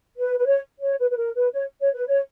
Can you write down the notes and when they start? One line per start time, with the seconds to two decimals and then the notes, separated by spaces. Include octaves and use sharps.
0.19 B4
0.38 B4
0.46 C#5
0.82 C#5
1.00 B4
1.10 B4
1.17 A#4
1.35 B4
1.53 C#5
1.80 C#5
1.94 B4
2.07 C#5